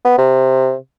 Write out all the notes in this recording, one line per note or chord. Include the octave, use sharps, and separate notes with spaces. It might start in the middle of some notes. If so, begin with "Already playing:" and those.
B3
C3